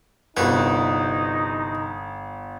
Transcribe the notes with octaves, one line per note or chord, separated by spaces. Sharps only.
G1 C2 D#4 F#4 B4